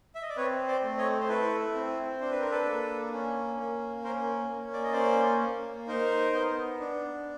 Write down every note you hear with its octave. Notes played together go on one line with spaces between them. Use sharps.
E5
D#5
D5
C4 B4 C#5
C5 D5
A3
C#5 D#5
C5
E4 A4 B4
C4
D4 C5
B4
A#4
A4 B4
A#3
C#4
A#3
C#4 A#4 C5
A#3
D5
D#5
C#4 C5 D5
A#3
D#4 A#4 C5
B3
D4